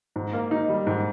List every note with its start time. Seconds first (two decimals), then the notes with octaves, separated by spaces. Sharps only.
0.16 G#2
0.33 A#3
0.51 D#4
0.69 G3
0.87 G#2